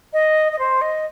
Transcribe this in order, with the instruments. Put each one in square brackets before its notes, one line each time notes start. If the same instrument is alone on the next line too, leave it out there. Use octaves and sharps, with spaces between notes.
[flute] D#5
D#5
C5
D#5